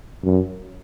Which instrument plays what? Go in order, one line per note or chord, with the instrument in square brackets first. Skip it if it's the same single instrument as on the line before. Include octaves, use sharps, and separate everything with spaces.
[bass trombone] F#2